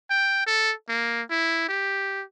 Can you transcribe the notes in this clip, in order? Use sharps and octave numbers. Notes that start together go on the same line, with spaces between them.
G5
A4
A#3
E4
G4